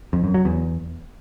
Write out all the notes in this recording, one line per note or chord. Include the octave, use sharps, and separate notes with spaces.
F2
F#2
F#3
E2